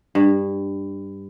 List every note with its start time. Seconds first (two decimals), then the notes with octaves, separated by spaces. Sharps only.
0.15 G2